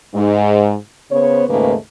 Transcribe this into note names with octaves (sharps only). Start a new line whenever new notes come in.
G#2
C#3 B3 C5 C#5
D#2 G#2 C#3 A3 A#3 B4